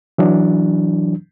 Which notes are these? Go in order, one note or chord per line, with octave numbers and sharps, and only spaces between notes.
E3 F#3 D4